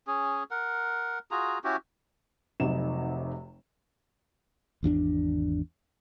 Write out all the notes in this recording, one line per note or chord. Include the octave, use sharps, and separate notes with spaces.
C#4 G#4
A#4 F#5
F4 F#4 G#4 A#5
C#4 E4 F#4 G4
F1 C3 F#3 D#4 E7
G#1 E2 C#4 D4